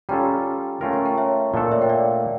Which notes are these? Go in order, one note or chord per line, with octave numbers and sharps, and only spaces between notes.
G3 C#4 F4 A4 G5 A#5
A3 C#4 F4 A#4 G5 A#5
A5 C#6
G5 A#5
C#5 E5
A#2 A3 D4 A4 D5
C#5 E5
G5
D5 F5